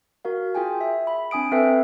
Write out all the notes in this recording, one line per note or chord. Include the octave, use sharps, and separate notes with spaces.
F#4 A#4 F5
F4 G#4 G5 G#5
E5
B5
C4 D4 G#5 D#6 D7
C4 A4 B4 E5 G5